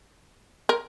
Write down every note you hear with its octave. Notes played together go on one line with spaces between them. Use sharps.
A#4